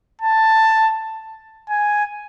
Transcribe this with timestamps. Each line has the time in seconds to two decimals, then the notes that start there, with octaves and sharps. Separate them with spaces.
0.22 A5
1.70 G#5